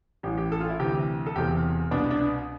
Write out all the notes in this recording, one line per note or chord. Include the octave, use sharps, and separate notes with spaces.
A1 A2 E3 G4
G4
A4
F4
E4
D2 C3 E3 G4
A4
E1 E2 C3 G4
C2 B2 D4
D4